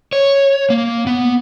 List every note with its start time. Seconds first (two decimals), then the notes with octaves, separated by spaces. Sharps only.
0.13 C#5
0.70 A#3
1.07 B3